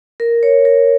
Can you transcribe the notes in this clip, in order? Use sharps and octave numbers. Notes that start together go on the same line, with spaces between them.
A#4
C#5
A#4